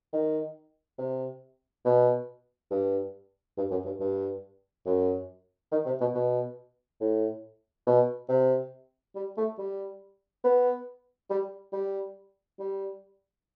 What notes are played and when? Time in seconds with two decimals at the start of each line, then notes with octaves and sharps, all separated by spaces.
0.13 D#3
0.98 C3
1.85 B2
2.71 G2
3.57 G2
3.71 F#2
3.85 G2
4.00 G2
4.86 F#2
5.72 D#3
5.86 C3
6.01 B2
6.14 B2
7.01 A2
7.87 B2
8.29 C3
9.16 G3
9.37 A3
9.58 G3
10.44 B3
11.30 G3
11.73 G3
12.59 G3